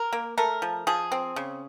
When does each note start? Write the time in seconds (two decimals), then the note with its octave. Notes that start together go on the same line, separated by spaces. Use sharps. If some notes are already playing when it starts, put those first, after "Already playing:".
Already playing: A#4
0.13 A#3
0.38 A3 A#4
0.62 F3
0.87 F3 G#4
1.12 C4
1.36 C#3